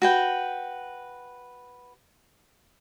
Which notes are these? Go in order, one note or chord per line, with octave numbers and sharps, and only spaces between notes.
F#4 B4 G5